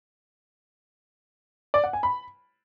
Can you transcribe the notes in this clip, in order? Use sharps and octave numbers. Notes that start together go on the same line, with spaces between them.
D5
F#5
G#5
B5